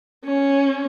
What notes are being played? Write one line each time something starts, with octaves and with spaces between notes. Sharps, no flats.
C#4